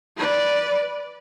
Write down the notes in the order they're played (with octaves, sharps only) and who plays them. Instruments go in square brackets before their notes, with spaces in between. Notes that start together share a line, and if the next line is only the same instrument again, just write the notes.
[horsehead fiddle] B4 D5